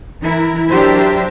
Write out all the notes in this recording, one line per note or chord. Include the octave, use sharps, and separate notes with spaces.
E3 E4 A#4
F#3 D4 G4 A#4 C5 E5